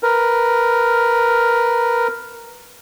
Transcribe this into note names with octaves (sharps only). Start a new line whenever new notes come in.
A#4 B4